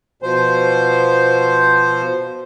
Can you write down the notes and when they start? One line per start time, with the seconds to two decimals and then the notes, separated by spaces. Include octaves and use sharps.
0.22 B2 F3 C5